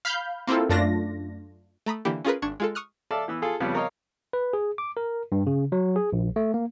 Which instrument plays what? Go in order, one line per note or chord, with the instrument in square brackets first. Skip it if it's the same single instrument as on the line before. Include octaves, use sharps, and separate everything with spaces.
[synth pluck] F5 B5 F6 G6
A#3 C4 E4 F4 A4
F#2 A3 D4 F4 A#6
A3 A#5 B5 D#6
D3 E3 A#3 E4 G4
C#4 F4 G#4 A#4 B4
G#1 D4 C#6 G#6 E7
G#3 F4 A4
C#6 D#6 F6 F#6
[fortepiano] A4 D5 E5 F5 A5
E3 B3 E6
F4 G#4 A4
F2 C#3 F3 G3 B3
A#4 C#5 D#5 F5
[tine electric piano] B4
G#4
D6
A#4
G2
C#3
F#3
G#4
A#1
A3
A#3